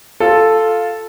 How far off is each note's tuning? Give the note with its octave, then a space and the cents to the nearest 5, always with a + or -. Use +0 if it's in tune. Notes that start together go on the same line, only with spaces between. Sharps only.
F4 +0 A4 +0